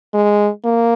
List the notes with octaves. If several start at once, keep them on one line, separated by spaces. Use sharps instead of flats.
G#3
A#3